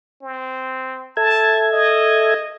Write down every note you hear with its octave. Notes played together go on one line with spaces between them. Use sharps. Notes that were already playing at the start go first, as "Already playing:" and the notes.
C4
A4 E5 A5 G#6
D#5